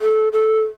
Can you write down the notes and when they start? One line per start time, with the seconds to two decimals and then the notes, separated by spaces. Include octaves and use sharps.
0.01 A4
0.33 A4